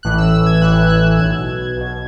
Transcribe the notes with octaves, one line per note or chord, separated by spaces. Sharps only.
A1 A2 E3 F#6
E6
E6
G#6
A1 A2 E3 F#6
F#6
B1 B2 G#6
B1 B2